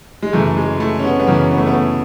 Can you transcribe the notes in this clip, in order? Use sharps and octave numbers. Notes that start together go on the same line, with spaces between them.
G#3
F#2 C#3 E3 A3
G#3
A3
C#4
B3
B3
F#2 C#3 E3 C#4
B3
A3
B3
A3